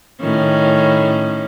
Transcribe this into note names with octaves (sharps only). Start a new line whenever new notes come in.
A2 D#3 C#4